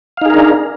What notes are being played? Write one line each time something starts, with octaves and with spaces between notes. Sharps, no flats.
D4 D#4 G#4 A#4 F5